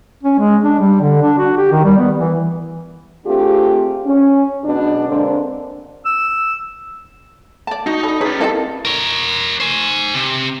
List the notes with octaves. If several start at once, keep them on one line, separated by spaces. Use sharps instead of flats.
C#4
G#3
D4
G3
D3
D4
F#4
G4
D#3
G3
B3
E3
A3 C4 D4 F4 G4 G#4
C#4
F#2 B2 G#3 D4
D3 G#3 A#3 C4 D4
E6
D5 A5
D#4 F#4
A4 D5 B5
C#4 G#4 B4 C#5 A#5
G3 C4 E4 A4 A#4 D5 D#5 A5
A#4 C#5
C5 G#5
C3